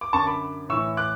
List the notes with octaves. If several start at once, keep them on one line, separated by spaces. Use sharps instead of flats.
D6
F#2 D3 A5 C#6
B5 D6
A2 E3 C#6 E6
D6 F#6